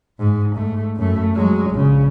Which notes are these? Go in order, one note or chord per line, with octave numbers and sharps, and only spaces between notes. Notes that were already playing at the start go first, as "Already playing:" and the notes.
G#2
G#2 A3
F#2 A3
F#3 G#3
A#1 C#3